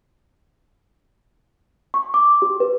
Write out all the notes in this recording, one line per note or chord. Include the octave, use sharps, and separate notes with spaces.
C#6
D6
G4
B4